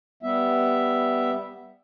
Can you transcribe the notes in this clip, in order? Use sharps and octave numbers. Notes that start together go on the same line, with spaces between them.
G3 B3 E5